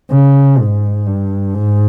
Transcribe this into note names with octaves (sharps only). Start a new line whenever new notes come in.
C#3
G#2
G2
G#2